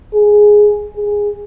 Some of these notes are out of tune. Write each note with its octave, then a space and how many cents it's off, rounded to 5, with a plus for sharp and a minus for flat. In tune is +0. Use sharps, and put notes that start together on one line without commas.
G#4 +5
G#4 -10